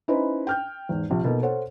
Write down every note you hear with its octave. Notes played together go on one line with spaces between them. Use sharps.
C#4 D#4 E4 B4 C5
G5 F6 G6
E2 G#2
A#1 C3
B2 A#3 D#4 A4
A4 C5 C#5 F#5